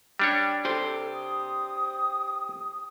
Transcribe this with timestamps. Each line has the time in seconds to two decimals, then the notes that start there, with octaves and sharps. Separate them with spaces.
0.19 G3 D4 C#5 G5
0.65 G4 A4 C5
1.14 D#6